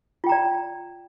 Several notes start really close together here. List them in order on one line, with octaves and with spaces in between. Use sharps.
F4 G5 A#5 D5